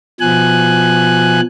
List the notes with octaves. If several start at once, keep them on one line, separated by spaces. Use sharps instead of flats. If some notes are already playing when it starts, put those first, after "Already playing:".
B2 F3 G#5 F#6